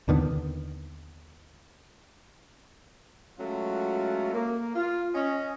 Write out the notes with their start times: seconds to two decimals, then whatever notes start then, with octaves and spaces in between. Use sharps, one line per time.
0.08 D#2 D3 D#3 B3
3.39 F#3 G#3 A3 C#4 F4 F#4
4.34 A#3
4.75 F4
5.15 C#4 D#5